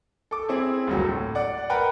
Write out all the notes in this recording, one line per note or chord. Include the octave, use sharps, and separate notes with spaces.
A4 D6
C4 E4 G#4
F#1 D2 F#3
A2
D5 F#5
A#4 B4 F#5 G5 A#5 B5